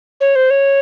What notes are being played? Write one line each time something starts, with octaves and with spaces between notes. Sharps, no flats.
C#5
C5
C#5